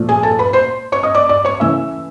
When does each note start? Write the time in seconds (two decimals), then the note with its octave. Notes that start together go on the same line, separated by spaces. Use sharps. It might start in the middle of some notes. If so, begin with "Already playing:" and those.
Already playing: A#2 F3 A3
0.09 G#4 G#5
0.23 A4 A5
0.38 B4 B5
0.53 C5 C6
0.92 C#5 C#6
1.03 D#5 D#6
1.15 D5 D6
1.29 D5 D6
1.45 C#5 C#6
1.60 E3 A3 C#4 E5 E6